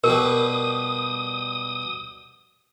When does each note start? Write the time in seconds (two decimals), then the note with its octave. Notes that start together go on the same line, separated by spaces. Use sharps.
0.04 B2 G3 A#4 D#6